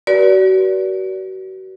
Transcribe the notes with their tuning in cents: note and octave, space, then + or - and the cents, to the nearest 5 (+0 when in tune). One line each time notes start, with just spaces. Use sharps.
F#4 +35 B4 -45 D5 -25